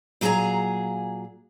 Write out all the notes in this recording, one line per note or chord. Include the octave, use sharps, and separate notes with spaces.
A#2 F#3 G#4 B4 G#5 A#5